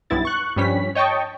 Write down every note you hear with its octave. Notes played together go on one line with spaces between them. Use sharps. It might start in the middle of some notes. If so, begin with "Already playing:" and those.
B1 G2 B3 E4 A6
C#6 F#6
G2 F3 G3 C#4 B6
C#5 D#5 G5 A5 C#6